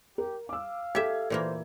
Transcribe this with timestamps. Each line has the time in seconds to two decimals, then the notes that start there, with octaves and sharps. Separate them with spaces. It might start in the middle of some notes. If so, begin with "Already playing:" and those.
0.18 G4 A#4
0.49 F5 D6 E6
0.95 G4 A4 E5 G#6
1.30 A#2 E3 A#3 C5